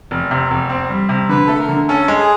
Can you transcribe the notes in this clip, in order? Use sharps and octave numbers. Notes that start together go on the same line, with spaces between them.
F1
C3
F1
C4
G3
C3
D3 B4
A3 A4
A#4
D3
C#4 A4
G#3
G#4